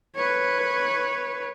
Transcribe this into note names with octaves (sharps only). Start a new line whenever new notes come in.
B4 C#5